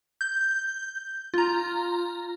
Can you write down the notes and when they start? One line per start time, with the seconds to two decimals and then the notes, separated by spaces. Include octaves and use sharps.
0.21 G6
1.34 F4 A#5